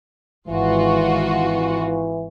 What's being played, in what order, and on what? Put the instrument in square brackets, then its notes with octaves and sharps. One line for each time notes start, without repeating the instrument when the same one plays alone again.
[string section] G#1 F4 F#4 [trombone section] E3